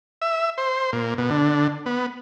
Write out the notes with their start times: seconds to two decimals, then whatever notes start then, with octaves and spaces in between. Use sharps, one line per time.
0.22 E5
0.58 C5
0.93 A#2
1.18 B2
1.30 D3
1.86 B3